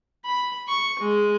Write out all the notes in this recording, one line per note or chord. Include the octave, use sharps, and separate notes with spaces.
B5
C#6
G#3